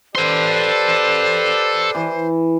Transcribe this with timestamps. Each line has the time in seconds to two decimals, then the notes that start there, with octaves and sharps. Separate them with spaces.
0.15 G4 A4 B4 C5 D5 C6
1.95 E3